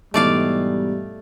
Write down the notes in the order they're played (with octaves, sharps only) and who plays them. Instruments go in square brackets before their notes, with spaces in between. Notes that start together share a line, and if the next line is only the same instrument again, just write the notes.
[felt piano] G#2 B2 E3 [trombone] G3 [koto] A3 D5 F5